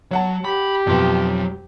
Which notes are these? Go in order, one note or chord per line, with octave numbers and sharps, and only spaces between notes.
F#3 C#5 F#5 A5
G4 B5
F2 B2 F#3 C6